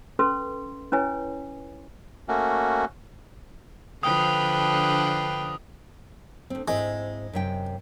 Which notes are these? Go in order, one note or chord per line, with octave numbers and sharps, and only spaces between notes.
C#4 A4 B4 C6
C#4 E4 B4 C#5 G#5
A3 A#3 C#4 F#4
D3 F3 D4 B4 G5 D#6
D2 C4
G#2 G#3 C4 E4
F#2 C3 G5